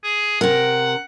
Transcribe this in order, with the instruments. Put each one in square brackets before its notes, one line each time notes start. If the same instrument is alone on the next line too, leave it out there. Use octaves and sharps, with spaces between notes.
[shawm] G#4
[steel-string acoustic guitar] C3 A#4 [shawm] F#5